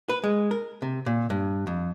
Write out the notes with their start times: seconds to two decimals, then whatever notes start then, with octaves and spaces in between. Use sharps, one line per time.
0.09 B4
0.24 G#3
0.51 A#4
0.82 C3
1.06 A#2
1.30 G2
1.67 F2